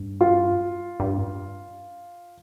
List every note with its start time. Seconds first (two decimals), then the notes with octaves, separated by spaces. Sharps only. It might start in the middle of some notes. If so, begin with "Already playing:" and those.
Already playing: G2
0.21 F4
1.00 G2